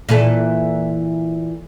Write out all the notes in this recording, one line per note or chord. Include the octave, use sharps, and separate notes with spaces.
A#2 E3 A4